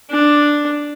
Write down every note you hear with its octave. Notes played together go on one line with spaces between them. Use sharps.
D4